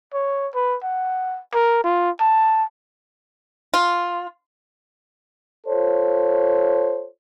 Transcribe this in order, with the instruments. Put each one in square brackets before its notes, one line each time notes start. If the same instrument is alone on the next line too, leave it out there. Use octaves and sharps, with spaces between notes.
[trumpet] C#5
B4
F#5
A#4
F4
A5
[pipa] F4
[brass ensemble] F4 A4 C5 C#5